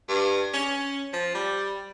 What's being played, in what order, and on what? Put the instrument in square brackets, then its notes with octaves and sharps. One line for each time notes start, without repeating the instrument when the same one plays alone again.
[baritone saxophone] G2
C#4
F3
G3